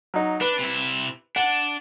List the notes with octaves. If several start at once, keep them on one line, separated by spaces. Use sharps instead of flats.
F#3 D#4
D4 B4
C3 E4
D4 F#5